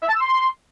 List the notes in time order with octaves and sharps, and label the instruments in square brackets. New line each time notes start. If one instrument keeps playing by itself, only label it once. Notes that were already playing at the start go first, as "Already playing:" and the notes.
[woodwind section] E5
A5
E6
C6